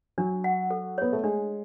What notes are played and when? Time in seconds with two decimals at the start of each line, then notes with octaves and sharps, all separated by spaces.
0.18 F#3 D4
0.44 F#5
0.71 A4
0.98 B3 C#5
1.13 A3
1.23 G#3 D4